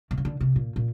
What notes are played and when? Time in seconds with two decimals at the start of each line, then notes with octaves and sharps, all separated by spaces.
0.11 C3
0.17 C#3
0.25 D3
0.41 C3
0.56 A#2
0.76 A#2